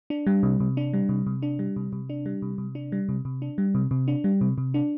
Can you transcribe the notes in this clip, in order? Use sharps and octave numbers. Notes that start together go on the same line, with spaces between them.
D4
G3
C3
C3
D4
G3
C3
C3
D4
G3
C3
C3
D4
G3
C3
C3
D4
G3
C3
C3
D4
G3
C3
C3
D4
G3
C3
C3
D4